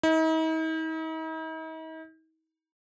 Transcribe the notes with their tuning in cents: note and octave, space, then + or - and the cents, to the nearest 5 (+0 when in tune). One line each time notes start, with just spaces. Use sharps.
D#4 +45